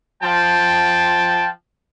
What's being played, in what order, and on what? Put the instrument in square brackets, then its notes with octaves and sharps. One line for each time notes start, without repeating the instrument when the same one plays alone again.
[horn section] F3 G5 A5